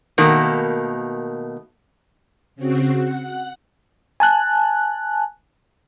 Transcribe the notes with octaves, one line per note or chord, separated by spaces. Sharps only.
B2 D#3 A3 A#3
C#3 C4 F#4
F#5
G#5 A5 F#6